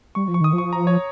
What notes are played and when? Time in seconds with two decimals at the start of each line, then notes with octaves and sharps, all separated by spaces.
0.15 G3 C#6
0.28 F3
0.34 C#6
0.41 D#3 D#6
0.53 F3
0.58 C#6
0.73 A#5
0.87 C#5